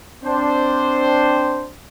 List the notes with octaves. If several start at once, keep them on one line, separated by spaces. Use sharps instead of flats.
C4 D4 C5